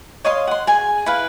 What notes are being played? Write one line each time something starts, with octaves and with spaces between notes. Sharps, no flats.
C#5 D#5 F5 C6
F#5 C6
G#4 G#5
E4 B4 F5